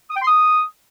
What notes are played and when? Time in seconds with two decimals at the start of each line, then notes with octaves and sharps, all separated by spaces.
0.10 D#6
0.16 G5
0.21 C6
0.27 D#6